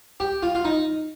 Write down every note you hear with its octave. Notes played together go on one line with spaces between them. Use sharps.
G4
F4
F4
D#4